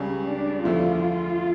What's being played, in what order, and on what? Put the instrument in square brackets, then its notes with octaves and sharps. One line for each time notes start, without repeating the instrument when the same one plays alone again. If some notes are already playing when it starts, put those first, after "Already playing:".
Already playing: [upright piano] C#2 C#3 G3 C#4
[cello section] D4
[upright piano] E2 D3 F3 A3 E4 [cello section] F4